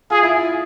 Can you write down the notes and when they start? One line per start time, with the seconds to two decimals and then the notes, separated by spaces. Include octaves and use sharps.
0.10 F4 G#4
0.23 E4
0.36 F4